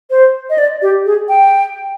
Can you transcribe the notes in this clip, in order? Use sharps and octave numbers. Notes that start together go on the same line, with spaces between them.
C5
D#5
D5
G4
G#4
G5